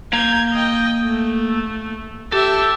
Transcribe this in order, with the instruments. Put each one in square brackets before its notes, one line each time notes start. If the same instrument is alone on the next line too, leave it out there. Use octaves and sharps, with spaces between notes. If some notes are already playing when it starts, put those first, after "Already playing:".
[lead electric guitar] A#3 A#5 [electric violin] G6 G#6
[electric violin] D#5 G5
A3
[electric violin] G4 E5 [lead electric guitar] A4